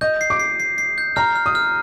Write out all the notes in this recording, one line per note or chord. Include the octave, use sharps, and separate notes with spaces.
D#5 G6
C7
D6
C7
C7
C7
G6
A#5 F6
F6
D#6
F6